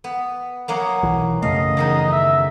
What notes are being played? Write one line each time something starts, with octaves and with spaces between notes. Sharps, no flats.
B3
F#3 A#3 B3
B1 E3
F#2 C#3 A3 D#5 F5
E2 D#3 D#4
E5